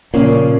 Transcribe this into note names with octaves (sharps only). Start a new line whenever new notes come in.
A#2 C#3 F3 A#3 C#4